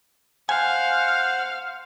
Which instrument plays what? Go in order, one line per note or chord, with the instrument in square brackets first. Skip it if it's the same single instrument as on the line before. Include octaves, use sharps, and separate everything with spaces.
[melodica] C5 F#5 [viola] F5 [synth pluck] G#5